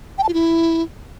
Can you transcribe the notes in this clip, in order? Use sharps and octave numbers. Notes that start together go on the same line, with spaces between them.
G5
A5
F4
E4